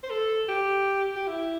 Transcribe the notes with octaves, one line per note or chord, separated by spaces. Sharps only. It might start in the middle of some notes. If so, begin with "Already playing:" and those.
C5
A4
G4
G4
E4